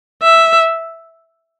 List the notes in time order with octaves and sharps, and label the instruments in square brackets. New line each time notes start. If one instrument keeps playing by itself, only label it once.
[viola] E5